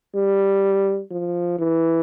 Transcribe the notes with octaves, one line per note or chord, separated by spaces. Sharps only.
G3
F3
E3